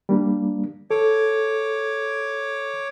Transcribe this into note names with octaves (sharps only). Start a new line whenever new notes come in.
G3 A#3 D4
A4 C#5 D6